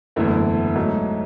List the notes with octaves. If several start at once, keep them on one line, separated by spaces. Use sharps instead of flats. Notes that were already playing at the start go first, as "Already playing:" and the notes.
F#1 E2 D3 A3 E4
G#2 F#3 A3